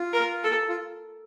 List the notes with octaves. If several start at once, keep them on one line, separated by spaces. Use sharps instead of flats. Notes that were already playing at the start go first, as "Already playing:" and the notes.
Already playing: F4
A#4
A4
F4